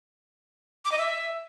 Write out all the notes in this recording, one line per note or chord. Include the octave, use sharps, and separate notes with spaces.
D6
D#5
E5